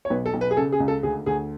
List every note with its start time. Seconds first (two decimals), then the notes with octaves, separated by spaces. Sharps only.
0.05 C#5
0.10 B1 B4
0.26 A4
0.34 B1
0.41 B4
0.51 G#4
0.57 C#3 A4
0.72 G#4
0.80 C#2
0.88 A4
1.03 D2 G#4
1.26 D2 G#4